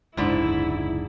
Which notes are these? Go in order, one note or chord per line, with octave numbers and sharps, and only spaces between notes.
F#1 C#2 G#2 D3 E4 B5